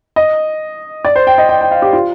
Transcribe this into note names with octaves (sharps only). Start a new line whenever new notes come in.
D#5
D5
C5
G5
D#5
G5
G5
F5
G4
F4